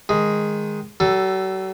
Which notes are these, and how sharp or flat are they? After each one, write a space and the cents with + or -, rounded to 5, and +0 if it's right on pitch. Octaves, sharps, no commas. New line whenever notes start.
D#3 +0 G#3 +0
F#3 +45 A4 +0